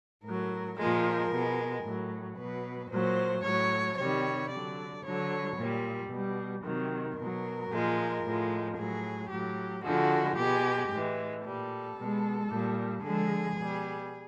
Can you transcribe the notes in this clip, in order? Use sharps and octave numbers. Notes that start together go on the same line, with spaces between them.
A2 F#3 A#4
A#2 F3 G#3 A#4
B2 G#3
A2 F#3
B2 F#3 B4
A#2 F#3 C5
A2 F#3 C#5
C3 D#3 G3 C#5
D3 F#3 D5
D3 F#3 C#5
A#2 G3
B2
G3
C3 D#3 F#3
B2 F#3 A#4
A#2 F3 G#3
A2 F3 G#3
A2 F#3 G#4
A2 F#3 G4
D3 F3 G#3 F#4
B2 G#3 G4
A2 E3 G#3
A#2 G3 A4
B2 G#3
A#2 G3
D3 F3 G#3 G#4
B2 G3